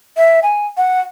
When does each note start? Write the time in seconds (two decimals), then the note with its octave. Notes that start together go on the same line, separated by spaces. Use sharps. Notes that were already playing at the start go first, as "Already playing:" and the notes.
0.17 E5
0.43 G#5
0.77 F#5